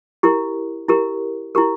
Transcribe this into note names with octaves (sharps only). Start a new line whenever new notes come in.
E4 G4 A#4
E4 G4 A#4
E4 G4 A#4